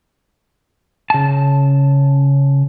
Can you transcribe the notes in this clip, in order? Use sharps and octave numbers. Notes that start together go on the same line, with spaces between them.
C#3 A5